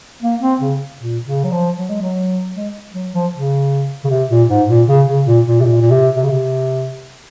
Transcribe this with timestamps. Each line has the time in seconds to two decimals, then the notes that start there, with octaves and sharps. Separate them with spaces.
0.22 A#3
0.41 C4
0.61 C#3
1.00 A#2
1.25 C#3
1.44 F#3
1.52 F3
1.78 F#3
1.89 G#3
2.02 F#3
2.55 G#3
2.93 F#3
3.13 F3
3.33 C#3
4.04 C#3
4.10 C3
4.30 A#2
4.49 G#2
4.69 A#2
4.87 C#3
5.07 C#3
5.26 A#2
5.46 A#2
5.61 C3
5.65 A#2
5.81 A#2
5.91 C3
6.16 C3
6.24 C#3
6.31 C3